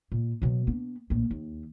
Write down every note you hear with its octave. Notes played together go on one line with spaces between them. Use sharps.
A#2
B2 F#3
B3 D4
A#1 A2
D#2